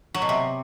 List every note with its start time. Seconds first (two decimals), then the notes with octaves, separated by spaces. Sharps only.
0.14 F#3
0.22 B2
0.29 C3